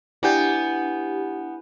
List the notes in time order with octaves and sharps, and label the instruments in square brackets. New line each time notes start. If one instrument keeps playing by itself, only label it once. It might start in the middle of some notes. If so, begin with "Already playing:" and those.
[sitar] B3 [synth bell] D4 G4 [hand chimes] E4 G#5 G6